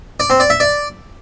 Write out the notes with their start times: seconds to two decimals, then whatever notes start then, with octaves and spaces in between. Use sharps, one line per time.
0.20 D5
0.30 C4
0.40 D5
0.50 E5
0.60 D5